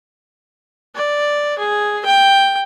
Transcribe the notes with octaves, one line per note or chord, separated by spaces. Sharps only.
D5
G#4
G5